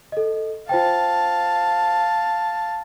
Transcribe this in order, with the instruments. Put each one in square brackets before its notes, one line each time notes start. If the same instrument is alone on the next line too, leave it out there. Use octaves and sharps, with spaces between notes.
[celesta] A4 D#5
[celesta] F4 C5 G5 [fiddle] F5 A5